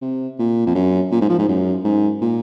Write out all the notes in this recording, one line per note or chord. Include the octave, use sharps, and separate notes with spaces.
C3
A#2
F2
F#2
A#2
G#2
F3
G#2
F#2
G#2
A#2